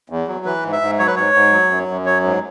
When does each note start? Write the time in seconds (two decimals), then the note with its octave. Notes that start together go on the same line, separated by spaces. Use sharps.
0.10 E2
0.28 F#3
0.45 E3 B4
0.64 G#2
0.72 E5
0.81 G#2
0.99 F#3 C#5
1.07 B4
1.16 G#2 C#5
1.34 G#2
1.53 F#3
1.70 F#2
1.88 F#2
2.06 F#3 C#5
2.24 G#2